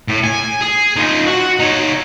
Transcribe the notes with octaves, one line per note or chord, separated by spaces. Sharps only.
A2
G#5
G#4
D#4 F4
F#4
D#4 C#5